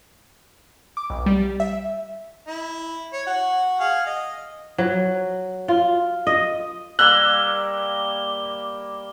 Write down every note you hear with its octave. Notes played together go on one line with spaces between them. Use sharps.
D6
B1
G3
E5
E4
C#5
F#4
G#4 F5 F#5
D#5
F#3
F4
D#5
G3 A#3 A#4 D6 E6 F#6 G7